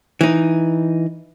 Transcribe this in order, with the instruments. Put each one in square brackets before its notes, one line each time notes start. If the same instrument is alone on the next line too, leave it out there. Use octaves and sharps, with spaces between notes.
[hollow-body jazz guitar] E3 D#4